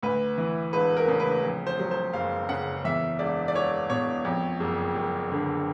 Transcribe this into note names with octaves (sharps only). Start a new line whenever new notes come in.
D2 B4
E3
E1 B4
A#4
C#3
B4
F2
C5
F#3
C5
F#1 F5
C#3 F#5
E2 E5
E1 D5
D5
E1 C#5
B2 C#5
F2
F#1
F#1
D3